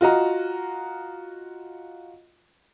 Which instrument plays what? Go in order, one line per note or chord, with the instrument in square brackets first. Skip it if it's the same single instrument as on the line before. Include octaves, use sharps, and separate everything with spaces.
[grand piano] F4 F#4 D#5 A#5